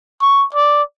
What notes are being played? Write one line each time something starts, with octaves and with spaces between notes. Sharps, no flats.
C#6
D5